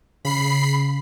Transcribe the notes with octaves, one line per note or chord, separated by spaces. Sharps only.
C#3 B5 C7